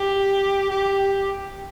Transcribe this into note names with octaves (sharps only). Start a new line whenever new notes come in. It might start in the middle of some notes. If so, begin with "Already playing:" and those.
Already playing: G4
G4